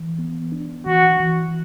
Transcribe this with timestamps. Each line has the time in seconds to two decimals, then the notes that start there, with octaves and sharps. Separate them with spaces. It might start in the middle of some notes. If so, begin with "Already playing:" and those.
Already playing: E3
0.18 B3
0.52 D4
0.86 E3 F#4
1.20 E3